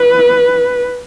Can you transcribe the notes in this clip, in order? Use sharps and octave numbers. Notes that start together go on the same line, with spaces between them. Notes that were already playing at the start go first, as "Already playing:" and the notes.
Already playing: B4